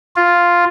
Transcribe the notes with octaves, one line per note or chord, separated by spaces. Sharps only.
F4